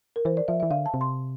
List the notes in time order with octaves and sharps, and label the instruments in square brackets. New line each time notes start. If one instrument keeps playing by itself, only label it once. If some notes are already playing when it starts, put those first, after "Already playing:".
[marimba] A#4
[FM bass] E3 [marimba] C5
[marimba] D5
[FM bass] F3 [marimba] E5
[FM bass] E3 [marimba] E5
[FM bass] D3 [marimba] F5
[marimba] A5
[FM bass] C3
[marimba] C6